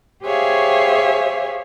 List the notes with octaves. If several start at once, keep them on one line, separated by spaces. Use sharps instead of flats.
G4 G#4 C5 C#5 E5 F5